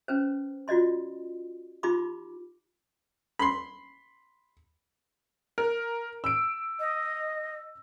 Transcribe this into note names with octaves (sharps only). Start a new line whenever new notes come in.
C#4 B4 C5
F4 F#4 D5 D#5 C6
D#4 F4 G4 B5 C6 D6
B5 C6
A#4
E6 D7
D#5